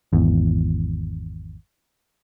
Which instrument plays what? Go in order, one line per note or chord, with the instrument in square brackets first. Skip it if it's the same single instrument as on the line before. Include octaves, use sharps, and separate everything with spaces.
[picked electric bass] G#1 E2